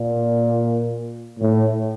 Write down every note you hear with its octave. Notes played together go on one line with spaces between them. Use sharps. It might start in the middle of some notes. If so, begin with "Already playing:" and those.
Already playing: A#2
A2